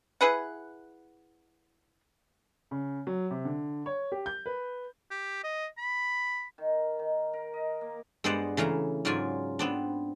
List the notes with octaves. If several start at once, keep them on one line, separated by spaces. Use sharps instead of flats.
E4 G#4 B4 F#5
C#3
F#3
C3
D3
C#5
G4
G6
B4
G4
D#5
B5
D#3
D#3
A#4
D#5
A#3
G2 G#3 B3 C5 D5 F#5
C#3 E3 A3 F5 A#5
G#2 C#3 F#3 F4 D5 G#5
B3 C4 D4